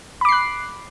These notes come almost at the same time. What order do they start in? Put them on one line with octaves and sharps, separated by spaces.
B5 D6 C7 F#6